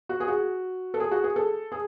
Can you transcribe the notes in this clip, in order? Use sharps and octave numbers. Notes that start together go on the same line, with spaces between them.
F#4
G#4
F#4
A4
G#4
F#4
G#4
A4
G#4